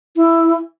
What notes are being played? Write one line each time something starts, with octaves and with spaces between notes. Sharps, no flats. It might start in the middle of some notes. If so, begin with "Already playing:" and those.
E4